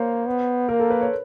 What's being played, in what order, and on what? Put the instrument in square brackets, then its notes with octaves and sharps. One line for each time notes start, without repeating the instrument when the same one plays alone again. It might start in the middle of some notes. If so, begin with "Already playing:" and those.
Already playing: [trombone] A#3 [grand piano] C5 C#5
[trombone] B3
[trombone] A#3 [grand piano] A#4
[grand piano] A4
B4
C#5